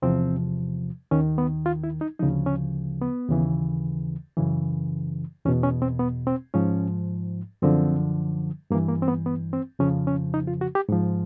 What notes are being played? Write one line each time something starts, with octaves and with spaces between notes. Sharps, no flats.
E2 C3 F3 C4
D#2 D#3 C#4
B3
F4
E4
D#4
D2 C#3 F3 D#4
C#4
B3
D#2 C#3 E3
F#2 C#3 E3
E2 B2 C#4
C#4
C4
B3
C4
G#2 F3 C#4
F#2 D3 F3 C4
G2 E3 A#3
A#3
C4
B3
B3
C4
F2 C#3 F3 C#4
C#4
D#4
F4
F#4
G4
G#2 F3